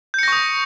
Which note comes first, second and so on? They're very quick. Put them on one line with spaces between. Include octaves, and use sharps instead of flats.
G6 C#7 A#6 C#6 D#6